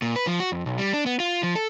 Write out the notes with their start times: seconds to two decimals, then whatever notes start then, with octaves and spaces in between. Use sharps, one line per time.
0.02 A#2
0.16 B4
0.27 F3
0.40 F#4
0.52 F2
0.66 B1
0.78 G3
0.94 D4
1.06 B3
1.20 F4
1.43 F3
1.55 A4